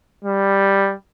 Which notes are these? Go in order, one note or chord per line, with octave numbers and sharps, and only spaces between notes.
G3